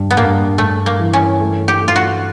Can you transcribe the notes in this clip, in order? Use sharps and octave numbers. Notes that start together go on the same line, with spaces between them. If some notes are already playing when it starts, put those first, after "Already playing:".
Already playing: G2
B3
G2 A#3
G2 A3
A#3
E3
C#4
A3
G4
A3
F4
F#4